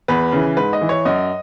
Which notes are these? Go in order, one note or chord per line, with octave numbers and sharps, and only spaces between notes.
E2 B4
C#3 E3
G#2 B4
D#5
E3
C#5
F#2 D#5